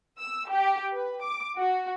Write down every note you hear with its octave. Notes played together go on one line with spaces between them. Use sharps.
E6
G4
B4
D6
F#4